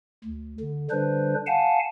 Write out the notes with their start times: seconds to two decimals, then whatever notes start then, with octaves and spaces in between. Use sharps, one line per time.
0.24 D2
0.60 D3
0.90 D3 G3 D4 B4 C5
1.46 F5 F#5 G#5 A5